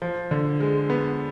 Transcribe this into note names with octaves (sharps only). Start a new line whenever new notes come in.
F3
D3
G#3
B3